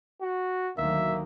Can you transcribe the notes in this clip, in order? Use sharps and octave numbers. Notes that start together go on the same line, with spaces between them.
F#4
D2 D#3 F#3 A#3 E5